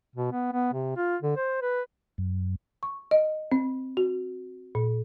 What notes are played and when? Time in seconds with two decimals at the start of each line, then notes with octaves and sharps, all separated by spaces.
0.16 B2
0.32 B3
0.53 B3
0.74 C3
0.97 F4
1.22 D3
1.37 C5
1.62 B4
2.18 F#2
2.83 C#6
3.11 D#5
3.52 C4
3.97 F#4
4.75 A#2